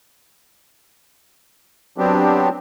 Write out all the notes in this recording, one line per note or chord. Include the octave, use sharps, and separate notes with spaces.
F#3 B3 C4 D4 G4